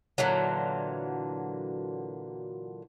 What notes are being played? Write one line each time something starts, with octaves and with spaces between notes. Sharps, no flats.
A#2 D3 E3 F#3